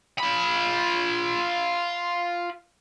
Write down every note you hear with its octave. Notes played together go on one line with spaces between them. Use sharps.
F4 B5